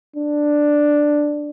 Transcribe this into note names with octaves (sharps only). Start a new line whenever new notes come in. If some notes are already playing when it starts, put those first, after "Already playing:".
D4